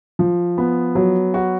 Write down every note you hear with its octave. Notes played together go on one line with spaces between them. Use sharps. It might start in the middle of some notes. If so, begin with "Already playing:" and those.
F3
B3
F#3
F#4